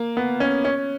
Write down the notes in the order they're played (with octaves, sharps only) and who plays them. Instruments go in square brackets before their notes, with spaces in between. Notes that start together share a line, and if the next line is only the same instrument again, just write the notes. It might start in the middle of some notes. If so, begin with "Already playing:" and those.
Already playing: [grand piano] A#3
B3
C#4
C#4